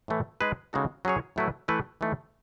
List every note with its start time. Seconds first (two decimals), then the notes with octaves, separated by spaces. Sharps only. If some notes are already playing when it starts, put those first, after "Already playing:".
0.08 A2 E3 A3 E4
0.41 G#3 D#4 G#4 B4
0.73 C#3 G#3 D#4 F#4 A4
1.05 F#3 C#4 G#4 C#5
1.36 A2 F#3 A3 E4 B4
1.68 E3 A3 E4 B4
2.01 E3 A3 D#4